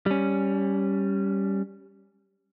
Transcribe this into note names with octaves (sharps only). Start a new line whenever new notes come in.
G3 C#4